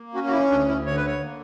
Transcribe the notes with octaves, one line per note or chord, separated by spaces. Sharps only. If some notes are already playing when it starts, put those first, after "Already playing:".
Already playing: A#3
C#4 F#4
F#4
E4
D2 D4
E4
D3 C#5
B4
C#5
A#3